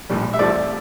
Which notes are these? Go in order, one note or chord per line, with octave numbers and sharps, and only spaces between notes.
A#1 A2 G3
E5
C2 C3 F3 A3 D5